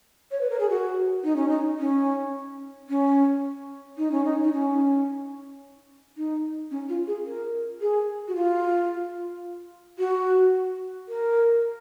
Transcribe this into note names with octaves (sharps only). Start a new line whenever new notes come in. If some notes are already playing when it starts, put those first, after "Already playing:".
C#5
B4
A#4
G#4
F#4
D#4
C#4
D#4
C#4
C#4
D#4
C#4
D#4
D#4
C#4
D#4
C#4
F4
G#4
A#4
G#4
F#4
F4
F#4
A#4